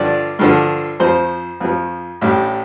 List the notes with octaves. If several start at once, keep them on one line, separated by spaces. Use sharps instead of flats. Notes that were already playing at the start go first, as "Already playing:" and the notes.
Already playing: G2 D3 F3 D5
G2 D3 F3
F2 F3 C5
F2 F3
A1 A2 G3